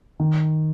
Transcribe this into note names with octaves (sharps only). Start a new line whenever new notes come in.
D#3